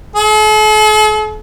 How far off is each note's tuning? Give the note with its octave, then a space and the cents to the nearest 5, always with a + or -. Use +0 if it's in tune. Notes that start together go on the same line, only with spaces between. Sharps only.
A4 -45